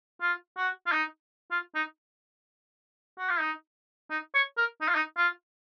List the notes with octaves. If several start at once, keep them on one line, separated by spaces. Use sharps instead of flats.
F4
F#4
F4
D#4
F4
D#4
F#4
F4
D#4
D#4
C#5
A#4
D#4
F4
D#4
F4